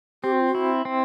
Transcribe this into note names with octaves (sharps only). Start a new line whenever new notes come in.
C4 G4
F#4
F4
F#4
E4
C4